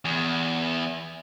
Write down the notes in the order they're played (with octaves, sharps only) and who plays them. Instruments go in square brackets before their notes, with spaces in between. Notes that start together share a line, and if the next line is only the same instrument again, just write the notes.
[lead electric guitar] E2